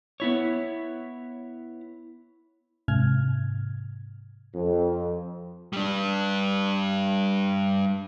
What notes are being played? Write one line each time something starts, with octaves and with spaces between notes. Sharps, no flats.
B3 E4 C#5
G#2 C3 F6 G#6
F2
G3 D4